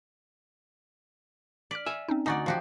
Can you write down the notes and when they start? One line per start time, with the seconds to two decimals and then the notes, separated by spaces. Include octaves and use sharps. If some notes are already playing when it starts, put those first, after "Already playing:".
1.71 D5 F6 B6
1.86 E5 G#5
2.08 C4 C#4 D#4
2.26 D2 D#4 F#4 D5 G#5 D6 A6
2.46 F3 F#4 G4